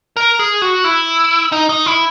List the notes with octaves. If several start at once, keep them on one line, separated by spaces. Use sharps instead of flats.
A#4
G#4
F#4
E4
D#4
D#4
E4